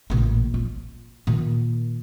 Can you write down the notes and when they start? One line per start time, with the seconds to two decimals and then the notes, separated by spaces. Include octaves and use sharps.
0.10 A1 A#2
0.54 F4
1.27 A#2 D#3